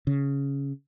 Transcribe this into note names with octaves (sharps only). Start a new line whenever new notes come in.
C#3